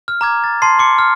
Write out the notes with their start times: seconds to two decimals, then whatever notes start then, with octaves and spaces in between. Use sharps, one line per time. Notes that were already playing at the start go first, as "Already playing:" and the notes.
0.08 F6
0.21 A#5 D6 G#6
0.44 A6
0.62 A5 C6 C7
0.79 C6 D6 C#7
0.99 F6